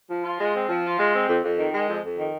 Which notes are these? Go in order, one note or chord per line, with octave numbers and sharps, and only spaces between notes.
F3
F4
G#3
C4
F3
F4
G#3
C4
F2
F2
D#3
G#3
F2
F2
D#3